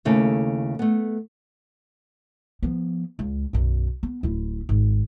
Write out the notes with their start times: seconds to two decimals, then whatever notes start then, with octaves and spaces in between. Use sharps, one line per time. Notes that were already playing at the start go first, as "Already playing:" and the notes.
0.05 D#2 C#3 A3 E4 A4
0.79 A3 B3
2.63 F3 B3
3.19 C#2
3.53 B1 F#2
4.03 B3
4.23 D1 E4
4.69 G#1